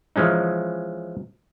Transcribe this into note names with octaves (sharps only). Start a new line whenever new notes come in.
E3 F3 G#3 C#4 D#4